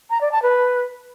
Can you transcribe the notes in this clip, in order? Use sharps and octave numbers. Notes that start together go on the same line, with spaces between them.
A#5
D5
A5
B4